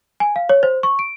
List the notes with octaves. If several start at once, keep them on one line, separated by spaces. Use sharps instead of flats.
G#5
F5
C#5
C5
C#6
D7